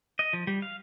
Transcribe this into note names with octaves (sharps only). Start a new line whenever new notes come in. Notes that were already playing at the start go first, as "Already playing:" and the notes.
D#5
F3
G3
F5